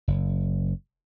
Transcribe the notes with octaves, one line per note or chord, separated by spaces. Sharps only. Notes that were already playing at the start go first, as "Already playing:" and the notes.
F#1